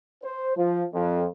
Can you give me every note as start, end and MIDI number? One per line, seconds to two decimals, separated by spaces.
0.23 0.56 72
0.57 0.83 53
0.94 1.25 41